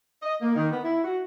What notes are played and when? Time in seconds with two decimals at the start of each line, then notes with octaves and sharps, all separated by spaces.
0.23 D#5
0.42 A#3
0.56 D#3
0.71 B3
0.83 E4
1.04 F#4